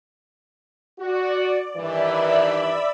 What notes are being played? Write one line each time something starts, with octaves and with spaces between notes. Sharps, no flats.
F#4 D5
G2 D#3 E3 D5 E5 B5